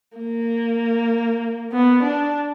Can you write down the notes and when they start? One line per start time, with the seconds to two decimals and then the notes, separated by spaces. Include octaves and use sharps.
0.17 A#3
1.73 B3
2.03 D4